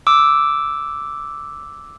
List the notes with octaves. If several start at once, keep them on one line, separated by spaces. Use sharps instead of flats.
D6 E6